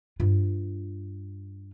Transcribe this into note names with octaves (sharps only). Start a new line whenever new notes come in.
G2 F4